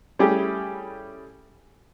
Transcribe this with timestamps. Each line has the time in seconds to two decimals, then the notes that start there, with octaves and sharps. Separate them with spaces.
0.19 G3 A3 C#4 E4 G4 G#4